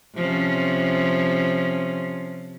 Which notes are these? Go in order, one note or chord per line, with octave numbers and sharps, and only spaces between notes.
C3 F3 C#4